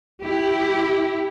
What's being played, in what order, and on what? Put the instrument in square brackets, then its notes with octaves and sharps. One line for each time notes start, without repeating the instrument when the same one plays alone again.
[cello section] E4 G4